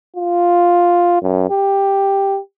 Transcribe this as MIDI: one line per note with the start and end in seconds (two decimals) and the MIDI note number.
0.17 1.18 65
1.22 1.48 42
1.50 2.39 67